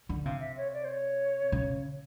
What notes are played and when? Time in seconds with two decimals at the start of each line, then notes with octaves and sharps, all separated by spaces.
0.09 D3
0.25 C3 F5
0.41 E5
0.57 C#5
0.74 D5
0.85 C5
0.89 C#5
1.52 C#3